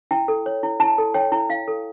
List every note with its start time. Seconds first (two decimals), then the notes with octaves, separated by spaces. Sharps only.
0.11 E4 G5
0.28 A4
0.46 C#5
0.63 E4
0.80 E4 A5
0.98 A4
1.14 C#5 G5
1.32 E4
1.49 E4 F5
1.68 A4